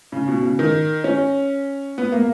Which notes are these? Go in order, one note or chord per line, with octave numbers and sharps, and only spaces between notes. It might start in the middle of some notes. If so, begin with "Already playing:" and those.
C#3
B2
C#3
D#3
C#4
B3
A#3